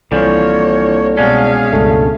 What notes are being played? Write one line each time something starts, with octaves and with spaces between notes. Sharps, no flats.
C2 D3 E3 F3 A#3 C#5
B2 G#3 C#4 D4 G#4 F5
C#2 G2 A3